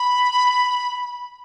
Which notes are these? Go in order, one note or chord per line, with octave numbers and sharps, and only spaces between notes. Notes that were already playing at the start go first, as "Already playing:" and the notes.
Already playing: B5